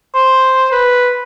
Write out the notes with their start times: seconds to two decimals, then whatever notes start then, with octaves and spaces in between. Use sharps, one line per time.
0.14 C5
0.72 B4